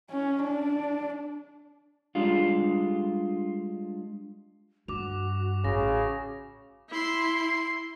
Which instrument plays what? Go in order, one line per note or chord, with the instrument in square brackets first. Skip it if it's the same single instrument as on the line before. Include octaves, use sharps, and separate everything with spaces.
[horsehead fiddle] C#4
D4
[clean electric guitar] G3 G#3 D4 F4
[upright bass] G2 [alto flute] F#4 [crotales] D6 F7
[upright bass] A1 [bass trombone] C#3 [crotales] A#6
[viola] E4 C6